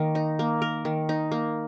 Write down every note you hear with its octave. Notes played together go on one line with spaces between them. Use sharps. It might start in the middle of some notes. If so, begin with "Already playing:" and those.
Already playing: D#3 A#3 A#4
D#4
A#3
A#4
D#3
D#4
A#3